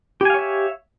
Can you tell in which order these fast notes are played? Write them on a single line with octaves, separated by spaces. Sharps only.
G4 G#5 F5 C#5 E5